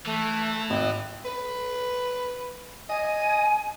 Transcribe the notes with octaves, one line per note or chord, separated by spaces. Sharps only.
E3 A3
G#1 D#5
B4
D#5 G#5